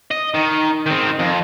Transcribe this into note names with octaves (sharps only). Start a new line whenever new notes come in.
D#5
D#3
D#3 C4
F2